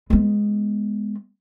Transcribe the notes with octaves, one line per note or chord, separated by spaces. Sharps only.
G#3 B3